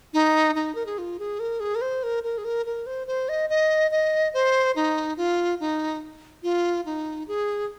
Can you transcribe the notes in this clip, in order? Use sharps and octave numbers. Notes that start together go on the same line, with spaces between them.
D#4
D#4
A#4
G#4
F4
G#4
A#4
G#4
A#4
C5
A#4
A#4
G#4
A#4
A#4
C5
C5
D#5
D#5
D#5
C5
D#4
F4
D#4
F4
D#4
G#4